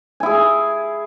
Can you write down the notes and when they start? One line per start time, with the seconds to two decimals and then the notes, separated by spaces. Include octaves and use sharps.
0.20 G#5
0.23 E4
0.26 G#4